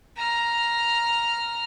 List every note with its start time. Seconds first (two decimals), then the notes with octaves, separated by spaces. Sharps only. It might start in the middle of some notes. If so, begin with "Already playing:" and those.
0.16 A#5 F6